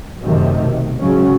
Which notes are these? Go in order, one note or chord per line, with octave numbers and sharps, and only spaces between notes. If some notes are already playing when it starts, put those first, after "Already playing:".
F#2 C3 D#3 A3
B1
G#2 C#3 F#3 C#4